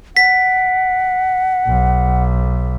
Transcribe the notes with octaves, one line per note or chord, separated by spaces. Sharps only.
F#5 B6
B1